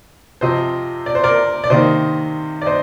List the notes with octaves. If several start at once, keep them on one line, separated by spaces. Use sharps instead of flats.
C3 F3 C4 C5 D#5
D5
C5
A#4 D5
D5
C3 D#3 A#3 C5 D#5
D5
C5 D#5